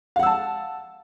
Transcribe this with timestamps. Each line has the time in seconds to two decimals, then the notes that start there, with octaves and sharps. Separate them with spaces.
0.16 F5
0.19 F#5
0.23 E6
0.26 A5